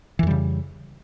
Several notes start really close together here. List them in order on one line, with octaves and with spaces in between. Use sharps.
E3 F2 G3 C#3